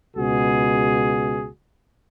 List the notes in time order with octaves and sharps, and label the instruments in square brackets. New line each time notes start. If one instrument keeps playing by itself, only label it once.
[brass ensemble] C#2 B2 F#4 G#4